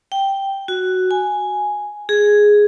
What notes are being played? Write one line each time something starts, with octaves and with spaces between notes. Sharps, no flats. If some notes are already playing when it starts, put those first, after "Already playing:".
G5
F#4
G#5
G#4